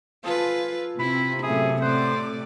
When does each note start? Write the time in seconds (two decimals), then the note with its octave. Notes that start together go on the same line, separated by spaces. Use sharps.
0.24 F3 F4 G#4 A4 B4
0.99 C3 E4 B5
1.43 F#2 A2 G#4 E5
1.82 A2 C5 D5 F#5